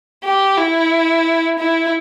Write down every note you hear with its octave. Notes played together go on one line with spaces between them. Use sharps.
G4
E4
E4